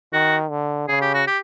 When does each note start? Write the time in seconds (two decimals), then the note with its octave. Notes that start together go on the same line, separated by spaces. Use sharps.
0.13 D#3 F#4
0.50 D3
0.88 C#3 G#4
1.02 G4
1.14 F#4
1.27 G4